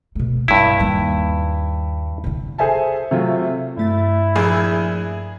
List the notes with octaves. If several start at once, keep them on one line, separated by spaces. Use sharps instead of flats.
B2 A3
B1 G2 E4
D#2 G3
C2 D3
G#4 A4 C5 E5 G#5 A5
C3 F#3 A3 F4
G2 A3 E4 A6
A#1 G#4